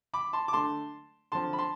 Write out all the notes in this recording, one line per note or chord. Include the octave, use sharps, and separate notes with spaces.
B5 D6
A5 C6
D6
D3 A3 D4 A5 C6
D3 F3 C4 A5 C6
B5
A5 C6